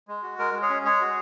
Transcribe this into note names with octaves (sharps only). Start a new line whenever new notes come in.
G#3
F#4
G#3 A#4
G#3
G#4 C#5
C#4
G#3 G#4 C#5
F#4